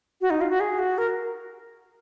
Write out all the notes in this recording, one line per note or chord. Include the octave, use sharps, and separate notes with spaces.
F#4
D#4
F4
F#4
G#4
F#4
A#4